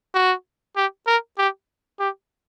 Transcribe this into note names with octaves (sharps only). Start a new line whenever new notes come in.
F#4
G4
A#4
G4
G4